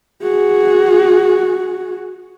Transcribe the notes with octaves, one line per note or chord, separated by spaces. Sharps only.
F#4 G#4